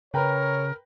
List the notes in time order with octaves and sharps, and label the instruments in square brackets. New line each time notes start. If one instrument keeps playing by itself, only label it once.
[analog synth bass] C#3 [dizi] A#4 [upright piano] B4 G5 A#5 [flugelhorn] C#5